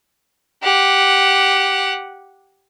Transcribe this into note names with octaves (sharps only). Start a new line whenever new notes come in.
G4 F#5